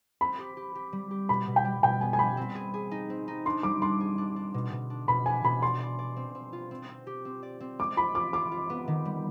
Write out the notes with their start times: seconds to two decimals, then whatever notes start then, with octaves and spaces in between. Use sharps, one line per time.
0.21 C4 B5
0.39 G4
0.57 G4
0.75 G4
0.93 G3
1.11 G4
1.29 B2 B5
1.48 B2
1.56 G5
1.65 G3
1.83 B2 G5
2.01 B3 G#5
2.13 G#5
2.19 G3 B5
2.37 C4
2.55 G#4
2.74 G#4
2.91 D#4
3.10 C4
3.28 D#4
3.46 D4 C6
3.63 G3 D6
3.82 D4 C6
4.00 G#4
4.18 D4
4.36 D4
4.54 B2
4.72 B2
4.90 D4
5.08 B2 B5
5.26 D4 G#5
5.44 B2 B5
5.62 D5 C6
5.80 D5
5.99 D5
6.16 C4
6.35 C4
6.53 F4
6.71 C4
6.89 C4
7.07 G4
7.25 C4
7.43 D5
7.60 C4
7.79 G#3 D6
7.97 F4 B5
8.15 F4 D6
8.33 F4 D6
8.52 F4
8.70 B3
8.88 D#3
9.05 G3